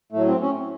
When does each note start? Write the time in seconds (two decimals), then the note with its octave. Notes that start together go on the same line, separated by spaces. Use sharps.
0.12 A2 F#3 A3
0.27 C4
0.41 C#4